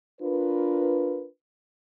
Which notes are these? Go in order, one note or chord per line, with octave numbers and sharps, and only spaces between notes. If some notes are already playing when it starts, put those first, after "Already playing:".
D4 F4 A#4 B4